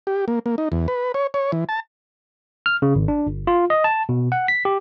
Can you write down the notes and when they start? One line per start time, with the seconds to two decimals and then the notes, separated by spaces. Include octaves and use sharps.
0.07 G4
0.28 A#3
0.46 A#3
0.58 D#4
0.72 E2
0.88 B4
1.14 C#5
1.34 C#5
1.52 E3
1.69 A5
2.66 F6
2.82 C#3
2.96 G#1
3.08 D4
3.27 G1
3.47 F4
3.70 D#5
3.84 A5
4.09 B2
4.32 F#5
4.48 B6
4.65 G4